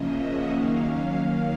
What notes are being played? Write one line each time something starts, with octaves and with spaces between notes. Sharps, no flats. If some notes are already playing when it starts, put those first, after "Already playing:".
Already playing: C#3 F3 A#3 C#4 D#5 E5
F#5
D#3 F#3 A#3 C#4 F5